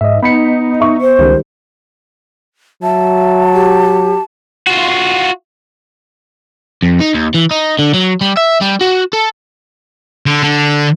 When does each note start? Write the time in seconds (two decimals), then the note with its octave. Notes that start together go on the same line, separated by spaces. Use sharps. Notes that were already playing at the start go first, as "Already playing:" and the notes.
0.01 G#2 D#5 E5
0.23 B3 D#4 B5 B6 C#7
0.80 E5 C#6
1.01 C5
1.19 C#2 D#3 G3
2.83 F#3 E5 A5
3.54 G4
4.67 F4 F#4
6.83 F2
7.00 D#4
7.14 D#2
7.34 E3
7.51 D#4
7.79 D3
7.94 F#3
8.21 G3
8.37 E5
8.61 G3
8.81 F#4
9.13 A4
10.26 D3
10.43 D3